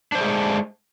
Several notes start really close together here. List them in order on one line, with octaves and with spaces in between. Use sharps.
D4 C5 A3 G#4 G#3